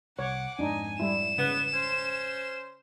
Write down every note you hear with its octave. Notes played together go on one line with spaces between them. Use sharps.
C2 C#5 F#5 D6
F2 G#2 D4 D#4 G#5
G3 E4 E7
C#3 B3
C#4 C5